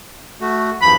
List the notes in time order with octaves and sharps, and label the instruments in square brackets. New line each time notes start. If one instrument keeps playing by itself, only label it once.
[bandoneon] A3 F#4
[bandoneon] E2 G2 F3 [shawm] B5